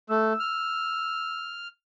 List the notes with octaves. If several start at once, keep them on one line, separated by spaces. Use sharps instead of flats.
A3 E6
F6